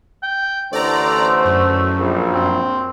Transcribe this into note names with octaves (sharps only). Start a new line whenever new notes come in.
G5
A1 D3 A3 C5 D5 A#5
F#2
A#1
C4